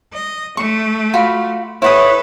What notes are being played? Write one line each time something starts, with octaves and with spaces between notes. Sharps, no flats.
D#5
A3 C#6
F4 F#4 B5
E4 A4 B4 C#5 F#5 D#6